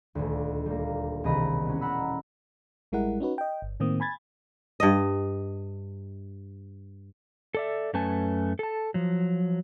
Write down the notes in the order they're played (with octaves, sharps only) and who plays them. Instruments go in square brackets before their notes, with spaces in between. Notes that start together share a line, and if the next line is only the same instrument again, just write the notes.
[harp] D#1 D2
G3 A#3
E1 C2 D#3 D#5 B5
B3 C#4
F#5 A#5 B5 E6
[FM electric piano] A1 G3 G#3 E4 A#4 F#5
C#4 D#4 F#4 B4
D#5 G5
G1
A2 D#3 A#3 C4 D#6
G#5 B5 G#6 A6
[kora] G2 D#5
[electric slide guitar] A4 D5 E5
F#2 A3 C#4 B4 G#5 A5
A4 A5
F3 F#3